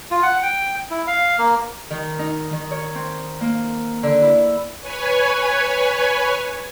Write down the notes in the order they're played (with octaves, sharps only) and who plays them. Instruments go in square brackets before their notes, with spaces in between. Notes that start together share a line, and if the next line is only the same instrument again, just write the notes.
[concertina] F4
F#5
G5
E4
F5
A#3
[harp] D#3
D#4
D#3
C#5
C4
A#3
D3
E4
[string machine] B4 C#5 G#5